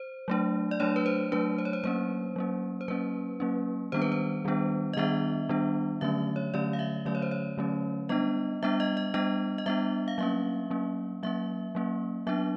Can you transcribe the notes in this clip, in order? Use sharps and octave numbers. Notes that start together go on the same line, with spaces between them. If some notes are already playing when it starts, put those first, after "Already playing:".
Already playing: C5
F#3 A3 D4
D5
F#3 A3 D4 C#5
B4
C5
F#3 A3 D4 B4
C5
C#5
C5
F#3 A#3 C#4 C5
F#3 A#3 C#4
C5
F#3 A#3 C#4 B4
F#3 A#3 C#4
D#3 G3 B3 D4 C5
B4
C5
D#3 G3 B3 D4
D#5
D#3 G3 B3 D4 E5
D#3 G3 B3 D4
D3 F#3 A3 C#4 E5
C#5
D3 F#3 A3 C#4 D5
F5
E5
D3 F#3 A3 C#4 D5
C#5
C5
C#5
D3 F#3 A3 C#4
G3 B3 D4 D#5
G3 B3 D4 E5
D#5
D#5
G3 B3 D4 D#5
D#5
G3 B3 D4 E5
F5
F#3 A#3 C#4 E5
F#3 A#3 C#4
F#3 A#3 C#4 E5
F#3 A#3 C#4
F#3 B3 D4 E5